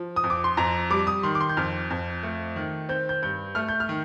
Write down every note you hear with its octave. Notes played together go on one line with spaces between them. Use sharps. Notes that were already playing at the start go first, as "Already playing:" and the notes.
Already playing: F3
D#6
F2
D6
C6
F2 A#5
G3 D6
D#6
D#3 C6
D6
C6
G6
F2 F6
F2
A3
D#3
C4 G6
G6
G2 G6
A3 F6
G6
F6
D#3